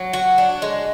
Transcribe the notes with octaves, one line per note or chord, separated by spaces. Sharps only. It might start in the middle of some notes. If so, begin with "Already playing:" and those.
Already playing: F#3
F#4
D4
G#3